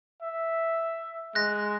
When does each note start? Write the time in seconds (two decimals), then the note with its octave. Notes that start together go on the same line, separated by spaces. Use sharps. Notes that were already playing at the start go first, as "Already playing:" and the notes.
0.22 E5
1.35 G#3 F#6 A#6